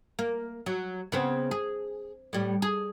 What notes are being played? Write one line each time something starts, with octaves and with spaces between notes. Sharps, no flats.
A#3
F#3
C#3 B3 C4
G#4
A2 G3
G#4